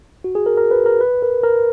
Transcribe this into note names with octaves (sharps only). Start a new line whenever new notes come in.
F#4
G#4
A#4
A#4
B4
A#4
B4
A#4
A#4